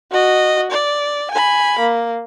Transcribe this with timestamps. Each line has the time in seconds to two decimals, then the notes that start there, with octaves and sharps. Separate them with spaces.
0.12 F#4 D#5
0.71 D5
1.32 G#5 B5
1.79 A#3